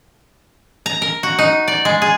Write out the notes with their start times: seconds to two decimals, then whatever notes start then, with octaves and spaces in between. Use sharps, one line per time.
0.86 A#5
1.02 A#4
1.23 F#4
1.39 D#4
1.68 D5
1.85 G#3
2.02 G#4